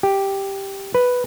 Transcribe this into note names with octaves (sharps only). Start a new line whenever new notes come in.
G4
B4